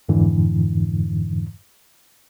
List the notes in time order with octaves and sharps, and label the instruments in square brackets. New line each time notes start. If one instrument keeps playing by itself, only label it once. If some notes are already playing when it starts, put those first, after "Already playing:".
[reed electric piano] F2 G#2 D3 E3